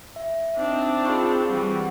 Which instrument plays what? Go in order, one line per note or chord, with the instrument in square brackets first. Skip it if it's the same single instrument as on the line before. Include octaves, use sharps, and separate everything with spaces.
[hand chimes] E5
[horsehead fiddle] C4 [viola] D4 [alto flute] D#4
[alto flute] F4 [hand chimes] G#4 B5 C#6
[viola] E3 G3 [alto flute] F#5